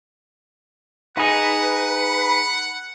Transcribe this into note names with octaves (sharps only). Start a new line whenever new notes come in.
D#4 G#4 B4 F#5